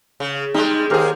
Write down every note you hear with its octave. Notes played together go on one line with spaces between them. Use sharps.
C#3
G3 G#3 D#4
D#2 G4 G#4 A#4 C5